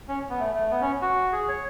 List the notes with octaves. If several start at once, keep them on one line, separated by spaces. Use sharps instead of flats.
C#4
B3
A3
A3
B3
C#4
F#4
G#4
C#5